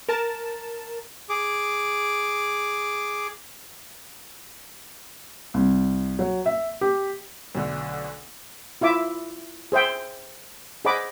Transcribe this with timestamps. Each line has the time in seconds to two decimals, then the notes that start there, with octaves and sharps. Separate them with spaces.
0.09 A#4 A5
1.29 G#4 D6
5.54 C2
6.19 F#3
6.46 E5
6.81 G4
7.55 B1 B2 D3 A3
8.81 E4 F4 E5 D6
9.72 G#4 C5 E5 G5
10.85 G#4 C5 D#5 F#5 B5 D6